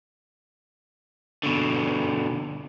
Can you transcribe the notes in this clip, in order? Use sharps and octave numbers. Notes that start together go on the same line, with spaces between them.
B2 D3